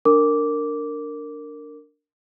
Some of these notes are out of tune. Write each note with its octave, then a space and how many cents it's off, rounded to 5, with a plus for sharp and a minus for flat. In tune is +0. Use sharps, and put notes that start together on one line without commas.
D4 +0 A#4 -20 D6 -10